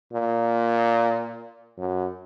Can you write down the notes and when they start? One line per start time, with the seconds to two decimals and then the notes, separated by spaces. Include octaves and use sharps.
0.13 A#2
1.77 F#2